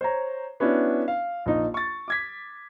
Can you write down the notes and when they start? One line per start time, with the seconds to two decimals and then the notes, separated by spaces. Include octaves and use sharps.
0.01 C5 C#5 A#5
0.60 B3 C#4 D4 E4 F#4
1.08 F5
1.46 A#1 D#4
1.74 C#6 A6
2.08 D6 G#6 B6